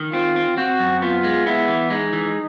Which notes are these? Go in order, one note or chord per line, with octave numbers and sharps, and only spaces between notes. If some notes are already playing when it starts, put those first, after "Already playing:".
Already playing: D#3
C4 F4
C4
C4 F#4
F#2
B3 F4
G#3
B3 E4
E3
G#3 D#4
E3